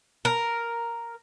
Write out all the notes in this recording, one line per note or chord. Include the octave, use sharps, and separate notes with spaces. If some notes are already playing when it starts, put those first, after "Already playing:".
A#4